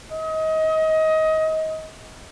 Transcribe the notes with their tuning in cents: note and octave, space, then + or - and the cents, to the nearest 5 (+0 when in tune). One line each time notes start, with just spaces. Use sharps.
D#5 +25